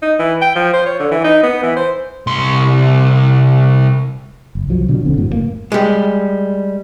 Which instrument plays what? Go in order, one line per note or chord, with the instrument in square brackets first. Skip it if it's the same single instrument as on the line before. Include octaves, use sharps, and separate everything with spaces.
[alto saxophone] D#4
E3
G5
F3
C5
C#5
D3
E3
D#4
B3
E3
C5
[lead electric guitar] C2 C6
[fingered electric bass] F#1
C2 F3 F#3
B2 D3 F3 F#3
E1 C#2 D3 C4
F#2 A2 F#3
F#1 A#2 A#3
[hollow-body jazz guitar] G3 G#3